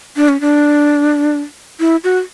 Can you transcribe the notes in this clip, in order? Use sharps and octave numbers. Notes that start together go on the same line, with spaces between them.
D4
C#4
D4
E4
F#4